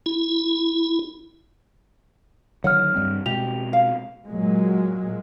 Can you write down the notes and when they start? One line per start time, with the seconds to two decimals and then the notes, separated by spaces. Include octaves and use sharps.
0.06 E4
2.64 D3 D#3 F#3 C#5 F#5 F6
2.95 G2 G3 C4
3.26 B2 G#3 C4 G4 F7
3.73 F5
4.25 A#2 F#3 G#3